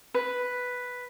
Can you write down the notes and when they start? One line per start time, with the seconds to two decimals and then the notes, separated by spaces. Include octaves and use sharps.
0.14 B4